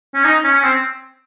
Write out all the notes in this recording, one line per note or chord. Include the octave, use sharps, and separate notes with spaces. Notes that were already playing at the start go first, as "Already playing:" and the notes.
C#4
D#4
C#4
C#4
C4